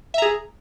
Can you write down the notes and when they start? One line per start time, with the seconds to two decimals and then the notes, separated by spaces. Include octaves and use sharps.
0.14 E5
0.18 A#5
0.22 G#4